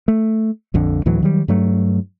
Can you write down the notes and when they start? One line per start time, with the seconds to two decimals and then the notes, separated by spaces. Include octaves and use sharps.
0.08 A3
0.74 A#1 F2 D3
1.06 D2 A2 E3 F#3
1.23 D#3 F#3 G3
1.48 G2 F#3 A3